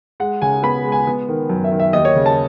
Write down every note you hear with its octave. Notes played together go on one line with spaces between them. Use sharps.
G#3 F#5
C#3 G#5
B3 B5
G#3
G#5
B3
D#3
F#2
E5
D#3
E5
D#2 D#5
C#5
C#3
A5